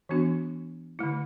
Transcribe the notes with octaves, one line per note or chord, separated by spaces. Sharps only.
E3 B3 D4 F#4
D3 A3 E4